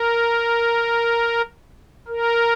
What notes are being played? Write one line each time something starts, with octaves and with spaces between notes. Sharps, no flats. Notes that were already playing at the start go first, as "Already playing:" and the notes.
Already playing: A#4
A#4